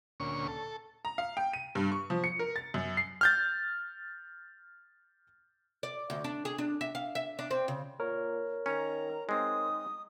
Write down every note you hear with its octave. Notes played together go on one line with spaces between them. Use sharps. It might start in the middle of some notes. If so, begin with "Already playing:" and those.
D2 A#2 C#4 C#6
A4
A#5
F5
G5
D#7
G2
C#6
F3
C#7
A#4
A6
F#2
C7
F6 G6 A6
D5
D2
D4
G#4
D4
E5
F5
E5
D4
C4
C#3
A#2 A#4 C#5
D#3 C#4 A#5
G#3 C4 D#4 D#6